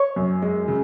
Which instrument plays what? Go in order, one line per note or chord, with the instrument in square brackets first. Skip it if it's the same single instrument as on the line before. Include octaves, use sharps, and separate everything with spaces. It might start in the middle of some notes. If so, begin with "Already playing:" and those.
Already playing: [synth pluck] C#5
[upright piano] F#2
G#3
C#3